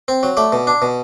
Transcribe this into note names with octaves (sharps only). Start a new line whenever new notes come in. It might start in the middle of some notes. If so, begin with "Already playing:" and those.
C4
F#3
A3 D5
B2
D4
B2